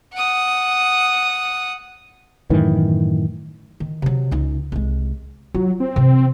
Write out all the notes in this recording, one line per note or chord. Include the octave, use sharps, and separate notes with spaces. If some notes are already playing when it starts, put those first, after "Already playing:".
F#5 D#6
F#2 A2 D#3 E3
D#3
C3 F#3
C#2 D#4
C2 G#3
F#3 F4
C4
C3 E3